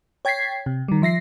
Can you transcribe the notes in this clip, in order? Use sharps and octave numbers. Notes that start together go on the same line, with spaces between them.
C#5 G5 G#6 A6 B6 C7
C3
D#3 G3
F3 E5 A#6 C7